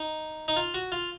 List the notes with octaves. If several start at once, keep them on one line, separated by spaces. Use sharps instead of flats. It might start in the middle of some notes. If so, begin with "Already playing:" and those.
Already playing: D#4
D#4
F4
F#4
F4